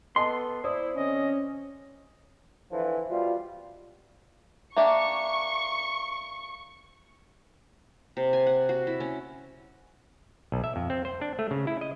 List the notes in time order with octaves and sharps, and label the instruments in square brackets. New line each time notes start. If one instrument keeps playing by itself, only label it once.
[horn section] B3 A4 [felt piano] D#5 A5 [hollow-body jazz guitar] C6
[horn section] E4 [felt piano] C5 D5 D#6
[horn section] D3 C4 D#5 [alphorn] C#4
[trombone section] D3 E3 F3
B2 G3 F4
[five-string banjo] A#3 D4 G4 [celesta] E5 [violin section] C#6
[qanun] C3
G#5
F#5
F#4
E4
C#4
[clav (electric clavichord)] B1
E5
F2
C4
C5
D4
A3
C#3
E4
D#5